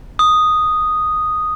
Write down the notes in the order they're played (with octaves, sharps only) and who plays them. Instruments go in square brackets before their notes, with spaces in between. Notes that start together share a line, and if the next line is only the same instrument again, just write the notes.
[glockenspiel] D#6